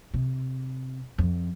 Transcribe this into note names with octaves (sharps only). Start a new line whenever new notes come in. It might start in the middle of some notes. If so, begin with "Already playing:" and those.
C3
F2